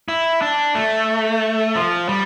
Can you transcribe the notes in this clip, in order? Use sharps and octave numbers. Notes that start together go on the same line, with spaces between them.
E4
D4
A3
F3
G3